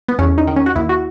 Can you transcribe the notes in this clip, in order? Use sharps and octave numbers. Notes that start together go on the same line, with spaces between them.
B3
E2 C#4
D#4
D#3
C#4
F#4
D#2 E4
F#4